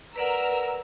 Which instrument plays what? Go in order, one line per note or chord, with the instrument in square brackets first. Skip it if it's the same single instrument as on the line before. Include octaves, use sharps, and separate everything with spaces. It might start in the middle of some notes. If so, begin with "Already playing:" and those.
[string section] A#4 A#5 E6 [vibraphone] B4 D5 F#5